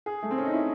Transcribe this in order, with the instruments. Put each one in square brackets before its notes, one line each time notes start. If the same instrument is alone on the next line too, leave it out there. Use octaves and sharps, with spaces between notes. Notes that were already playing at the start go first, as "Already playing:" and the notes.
[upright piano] G#4
A3
C4
C#4
D#4
E4